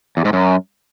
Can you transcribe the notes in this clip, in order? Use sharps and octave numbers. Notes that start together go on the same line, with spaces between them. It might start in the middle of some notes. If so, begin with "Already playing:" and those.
E2
G#2
F#2